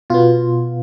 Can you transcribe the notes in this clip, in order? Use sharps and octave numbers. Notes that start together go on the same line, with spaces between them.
B2 B3 F4